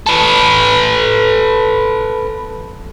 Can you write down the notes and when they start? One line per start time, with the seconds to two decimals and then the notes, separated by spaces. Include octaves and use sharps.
0.07 A4 B4